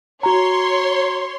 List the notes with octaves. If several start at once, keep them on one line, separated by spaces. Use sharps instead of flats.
F#4 C#5 A#5 C6